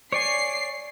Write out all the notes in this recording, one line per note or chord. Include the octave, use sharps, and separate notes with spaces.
C#5 D5 G#5 C7